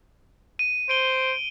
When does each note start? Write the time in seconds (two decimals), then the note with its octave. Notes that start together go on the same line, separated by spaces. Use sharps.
0.59 D#7
0.89 C5 D7 D#7 G7